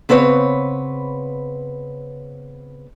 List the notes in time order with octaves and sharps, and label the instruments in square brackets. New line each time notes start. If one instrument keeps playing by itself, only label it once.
[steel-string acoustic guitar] C#3 B3 C4 B4 C#5